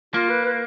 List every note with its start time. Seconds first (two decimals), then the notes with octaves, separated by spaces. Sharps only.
0.14 A#3 F4
0.29 B4
0.45 B4